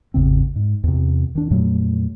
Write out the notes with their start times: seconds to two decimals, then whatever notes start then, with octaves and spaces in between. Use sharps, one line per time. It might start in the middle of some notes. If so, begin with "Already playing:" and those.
0.14 G#1 E2 C#3 C4
0.56 G#2
0.84 E2 C3
1.35 D#3 D4
1.51 F2 A#2 F#3 A3